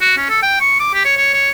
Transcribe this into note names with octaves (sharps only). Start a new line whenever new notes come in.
F#4
C#4
A4
G5
C#6
D6
G4
C#5
C#5
C#5